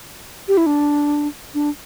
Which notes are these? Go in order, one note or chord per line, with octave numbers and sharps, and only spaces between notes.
G4
E4
D4
D4